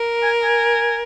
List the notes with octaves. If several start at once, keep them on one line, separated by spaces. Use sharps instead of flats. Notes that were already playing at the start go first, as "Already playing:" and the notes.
Already playing: A#4
G#5
G#5